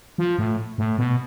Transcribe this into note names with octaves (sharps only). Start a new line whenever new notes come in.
F3
A2
A2
B2